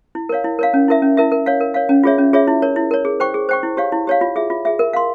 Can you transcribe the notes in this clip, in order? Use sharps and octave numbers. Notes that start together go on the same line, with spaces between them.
E4
A#4 C#5 F5
E4
A#4 C#5 F5
C#4
E4 A#4 E5
C#4
E4 A#4 E5
A#4
C#5 F5
A#4
C#5 F5
C#4
F4 G#4 C#5 E5
C#4
F4 G#4 C#5 E5
E4
A#4 C#5
E4
A#4 C#5
G#4
C5 G5 C#6
G#4
C5 G5 C#6
E4
G4 C#5 F5
E4
G4 C#5 F5
F4
G#4 E5
F4
G#4 E5
A#4
F5 C6